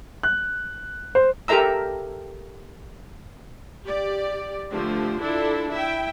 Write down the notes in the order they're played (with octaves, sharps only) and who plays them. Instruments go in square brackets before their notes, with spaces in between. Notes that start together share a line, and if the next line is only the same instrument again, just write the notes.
[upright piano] F#6
C5
[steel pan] G4 A4 A#4 E5 A#5 E6
[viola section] G4 D5
D3 F3 A3 G4 C5
D4 E4 F4 A4
E4 E5 G5